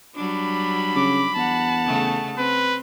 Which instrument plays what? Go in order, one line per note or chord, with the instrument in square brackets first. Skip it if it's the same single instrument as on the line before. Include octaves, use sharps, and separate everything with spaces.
[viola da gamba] F#3 G3 D4 [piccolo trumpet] B5
[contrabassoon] C#3 [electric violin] D6
[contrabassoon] E2 [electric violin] F#5 A5
[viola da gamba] C#3 A3
[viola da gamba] C4 [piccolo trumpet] B4